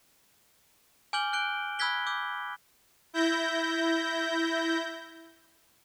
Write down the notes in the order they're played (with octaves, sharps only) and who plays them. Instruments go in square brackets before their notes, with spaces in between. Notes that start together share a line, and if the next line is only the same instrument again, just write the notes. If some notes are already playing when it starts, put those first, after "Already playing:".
[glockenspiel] G#5 D6 F6 G6 F#7 G7
F#6 G6 D7 G7
B5 E6 F#6 G#6 B6 G7
D6 E6 G6
[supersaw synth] E4 G6 A#6